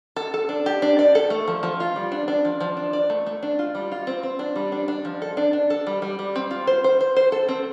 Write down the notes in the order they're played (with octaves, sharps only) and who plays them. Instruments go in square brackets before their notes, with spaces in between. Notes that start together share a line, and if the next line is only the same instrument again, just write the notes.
[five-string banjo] A4
A4
D4
G4
D4
D5
A4
A3
F3
F3
F4
G3
D4
D4
F3
F3
D4
D5
A3
A3
D4
F4
G3
F4
C4
C4
D4
G3
D4
D4
F3
A4
D4
D4
A4
G3
G3
G3
C4
F4
C5
C5
C5
C5
A4
C4